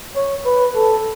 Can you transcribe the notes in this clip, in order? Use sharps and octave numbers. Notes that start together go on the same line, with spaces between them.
C#5
B4
A4